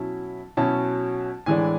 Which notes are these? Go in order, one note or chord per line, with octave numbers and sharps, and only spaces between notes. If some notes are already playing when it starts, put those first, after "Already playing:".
Already playing: B2 F#3 C#4 E4 A5
B2 F#3 C#4 E4 A5
A2 E3 G#3 D4 G#5